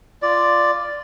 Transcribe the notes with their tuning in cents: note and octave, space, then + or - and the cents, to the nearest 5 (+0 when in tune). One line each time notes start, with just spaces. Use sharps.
F4 -10 D5 +0